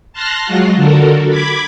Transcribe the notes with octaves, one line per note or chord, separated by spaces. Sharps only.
A5 C6 F6 F#6 A#6
F#3 G#3 F4 F#4
D3 F#4 A4 A#4
B5 D6 G#6 B6